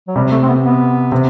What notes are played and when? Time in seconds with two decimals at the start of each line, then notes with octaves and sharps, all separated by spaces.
0.08 F#3
0.16 C3 G3
0.31 A3
0.43 C4
0.48 B3
0.63 B3
1.12 C3